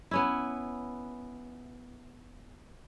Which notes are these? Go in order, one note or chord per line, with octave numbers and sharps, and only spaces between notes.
B3 C#4 E4